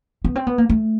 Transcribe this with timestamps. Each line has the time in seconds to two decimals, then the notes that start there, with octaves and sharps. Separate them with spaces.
0.25 B3
0.36 C4
0.47 B3
0.58 A#3
0.69 A3